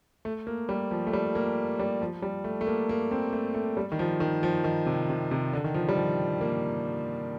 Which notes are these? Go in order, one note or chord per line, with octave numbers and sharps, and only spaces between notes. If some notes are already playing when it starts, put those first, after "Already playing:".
A3
A#3
G3
F3
A3
G3
A#3
G3
F3
G3
A3
A3
A#3
A#3
C4
A3
A3
G3
D#3
F3
D#3
F3
D#3
C3
C3
C3
D3
D#3
F3
G3
F3
A#3